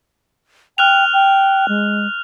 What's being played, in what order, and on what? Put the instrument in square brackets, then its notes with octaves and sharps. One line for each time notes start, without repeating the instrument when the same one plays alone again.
[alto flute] G5 [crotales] F6 F#6 F7
[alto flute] G5
G#3